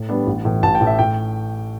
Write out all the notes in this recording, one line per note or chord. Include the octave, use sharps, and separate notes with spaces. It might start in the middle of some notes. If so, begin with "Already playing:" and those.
Already playing: A2
G3 B3 D4
A1
A2 E3
A1 A5
G5
A2 E3
E5
A2 G5